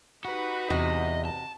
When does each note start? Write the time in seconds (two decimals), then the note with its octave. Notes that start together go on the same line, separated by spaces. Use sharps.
0.25 D#4 F#4 G4 B4
0.70 E2 C3 F#4 D#5
1.25 A5